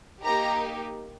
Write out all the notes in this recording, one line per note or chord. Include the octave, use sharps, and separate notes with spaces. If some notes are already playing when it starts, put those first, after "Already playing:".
A#3 D#4 G4 A#5